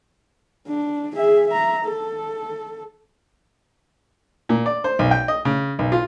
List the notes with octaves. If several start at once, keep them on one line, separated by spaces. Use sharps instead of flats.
D4
G#4 E5
E5 A#5
A4
A#2
D5
C5
B1
G5
D#5
C#3
B1
F4